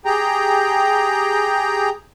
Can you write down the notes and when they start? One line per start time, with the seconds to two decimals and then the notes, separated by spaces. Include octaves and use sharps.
0.05 G4 G#4 G5 A#5